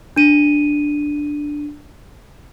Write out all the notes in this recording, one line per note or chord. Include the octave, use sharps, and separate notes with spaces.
D4 D#7